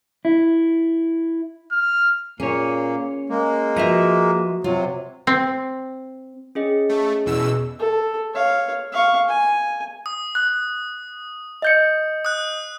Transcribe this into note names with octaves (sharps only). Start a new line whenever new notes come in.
E4
F6
A#2 A#3 C#4 G#4 C#5
G#3 A#3
F3 F#4 B4 E5 A#5
C3 F#3 F4
C4
C#4 G#4 D#5
A3
E2 B2 E6
A4
C#5 F5
F5 C#6
G#5
D#6
F#6
D#5 G6 C#7
D#6 F#6